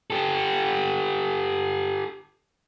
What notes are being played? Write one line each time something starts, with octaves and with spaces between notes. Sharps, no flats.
G4 A4